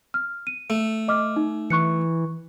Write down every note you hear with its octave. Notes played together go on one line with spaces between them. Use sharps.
F6
D#7
A3
D#5 D6 F6
D#4
E3 C#6 F#6 C#7